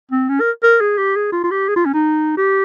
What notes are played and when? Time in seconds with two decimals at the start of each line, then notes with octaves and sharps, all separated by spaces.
0.11 C4
0.29 C#4
0.40 A#4
0.63 A#4
0.80 G#4
0.98 G4
1.16 G#4
1.32 F4
1.44 F4
1.51 G4
1.68 G#4
1.76 F4
1.86 C#4
1.94 D#4
2.37 G4